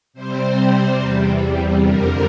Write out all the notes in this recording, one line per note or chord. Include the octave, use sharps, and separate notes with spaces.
C3 G3 C4 C5
E2 C3 G3
F2 D3 G3 A#4